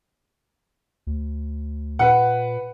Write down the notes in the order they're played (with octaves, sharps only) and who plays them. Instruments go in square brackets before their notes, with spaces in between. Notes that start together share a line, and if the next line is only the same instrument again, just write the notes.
[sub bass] D2
[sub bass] A#2 [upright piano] B4 F#5